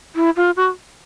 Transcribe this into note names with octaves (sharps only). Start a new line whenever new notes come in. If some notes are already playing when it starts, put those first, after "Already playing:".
E4
F4
F#4